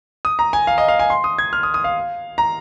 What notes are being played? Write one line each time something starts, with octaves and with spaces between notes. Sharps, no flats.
D#6
A#5
G#5
F5
D#5
F5
G#5
C6
D#6
G#6
F6
D#6
D#6
F5
A#5